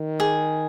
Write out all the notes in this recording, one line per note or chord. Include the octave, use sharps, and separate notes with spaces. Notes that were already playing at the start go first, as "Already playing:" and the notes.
Already playing: D#3
G#4